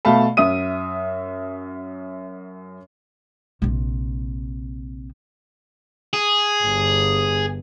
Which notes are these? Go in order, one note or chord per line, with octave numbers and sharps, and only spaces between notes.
B2 A3 F5 A5 B5
F#2 E5 D#6 D#7
A#1 C3
G#4
G1